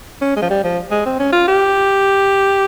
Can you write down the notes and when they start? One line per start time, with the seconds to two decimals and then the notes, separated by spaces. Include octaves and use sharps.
0.21 C#4
0.36 G#3
0.42 F3
0.50 G3
0.64 F3
0.91 G#3
1.06 C4
1.20 C#4
1.33 F4
1.48 G4